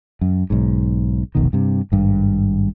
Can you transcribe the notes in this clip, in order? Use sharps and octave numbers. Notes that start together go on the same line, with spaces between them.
F#2
B1 G#2
F1 B1 B2 D#3
G2 C3
G#1 G2